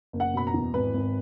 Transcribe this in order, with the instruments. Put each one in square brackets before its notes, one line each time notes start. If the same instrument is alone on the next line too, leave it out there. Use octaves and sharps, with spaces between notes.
[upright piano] F#1
F#5
B2 B5
A#5
E2
G#1 B4
G#1